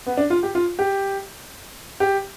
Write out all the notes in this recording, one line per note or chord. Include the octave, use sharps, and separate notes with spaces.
B3
D4
F4
G4
F4
G4
G4